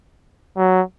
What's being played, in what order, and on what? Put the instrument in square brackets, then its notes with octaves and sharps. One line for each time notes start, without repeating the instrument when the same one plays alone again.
[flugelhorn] F#3